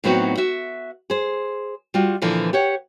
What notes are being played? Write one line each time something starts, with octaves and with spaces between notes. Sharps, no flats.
A2 F#3 B3 C4 D#4 F#4
F#4 E5
G#4 C5
G3 F4 F#4
A#2 D3 E3 F3
G4 C#5 F#5